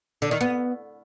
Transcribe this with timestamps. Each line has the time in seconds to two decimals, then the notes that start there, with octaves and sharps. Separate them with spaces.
0.22 D3
0.31 D#3
0.41 B3